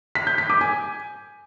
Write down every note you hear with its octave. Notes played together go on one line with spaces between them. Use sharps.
B6
G6
B6
D6
G#5